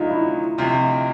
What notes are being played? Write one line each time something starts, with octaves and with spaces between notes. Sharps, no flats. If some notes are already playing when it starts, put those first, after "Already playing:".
Already playing: D2 D3 F#3 A3 D#4 F4
E4
D2 C3 F3